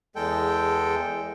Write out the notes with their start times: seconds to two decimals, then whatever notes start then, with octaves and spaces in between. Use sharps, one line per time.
0.16 E2 G#3 A4 G5